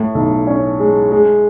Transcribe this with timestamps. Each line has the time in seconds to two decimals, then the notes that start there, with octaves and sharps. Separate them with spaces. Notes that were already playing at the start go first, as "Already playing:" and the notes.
Already playing: A2
0.15 B1
0.47 C#4
0.80 G#3
1.12 G#3